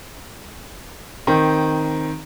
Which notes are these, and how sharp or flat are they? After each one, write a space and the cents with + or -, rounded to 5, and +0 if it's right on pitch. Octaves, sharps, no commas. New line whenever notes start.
D#3 +0 C4 +0